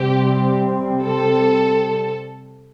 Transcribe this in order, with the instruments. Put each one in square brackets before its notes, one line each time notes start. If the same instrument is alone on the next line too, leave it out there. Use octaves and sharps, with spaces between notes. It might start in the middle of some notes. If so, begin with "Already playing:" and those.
Already playing: [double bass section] C3 G3 C4 [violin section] G4
[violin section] A4